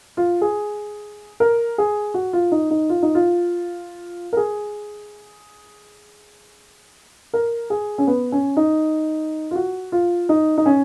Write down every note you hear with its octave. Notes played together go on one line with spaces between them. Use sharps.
F4
G#4
A#4
G#4
F#4
F4
D#4
D#4
F4
D#4
F4
A#4
G#4
A#4
G#4
C#4
B3
C#4
D#4
F4
F#4
F4
D#4
D#4
C#4